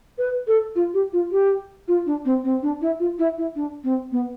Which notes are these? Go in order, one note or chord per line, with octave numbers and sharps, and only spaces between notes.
B4
A4
F4
G4
F4
G4
F4
D4
C4
C4
D4
E4
F4
E4
E4
D4
C4
B3